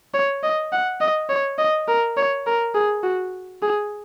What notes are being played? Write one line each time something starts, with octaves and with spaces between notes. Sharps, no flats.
C#5
D#5
F#5
D#5
C#5
D#5
A#4
C#5
A#4
G#4
F#4
G#4